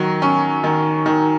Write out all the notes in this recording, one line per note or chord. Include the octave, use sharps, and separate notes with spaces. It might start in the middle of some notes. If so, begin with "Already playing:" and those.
Already playing: D#3 F#3
C#4
D#3
D#3